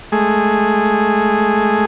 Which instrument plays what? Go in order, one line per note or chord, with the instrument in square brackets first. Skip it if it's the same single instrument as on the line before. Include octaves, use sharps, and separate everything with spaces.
[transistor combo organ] G#3 A3 G#4